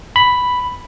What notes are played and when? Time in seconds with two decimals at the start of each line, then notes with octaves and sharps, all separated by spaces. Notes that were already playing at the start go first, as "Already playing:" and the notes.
0.16 B5